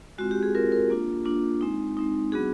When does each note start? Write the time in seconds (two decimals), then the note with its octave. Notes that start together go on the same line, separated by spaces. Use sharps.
0.18 G#3 C4 F4 F#4
0.31 G4
0.43 G#4
0.55 G#3 C4 F4 A#4
0.72 A#4
0.90 A#3 D4 F4
1.25 A#3 D4 F4
1.61 G#3 C4 D#4
1.97 G#3 C4 D#4
2.32 F#3 B3 D4 F#4 G#4